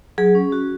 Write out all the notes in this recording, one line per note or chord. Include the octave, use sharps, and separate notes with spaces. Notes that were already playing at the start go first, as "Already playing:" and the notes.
F#3 G#4
C#4
F#4